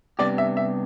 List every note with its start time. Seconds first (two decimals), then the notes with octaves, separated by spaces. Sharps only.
0.19 C3 G3 B3 D4 G4 D5
0.38 E5
0.57 E5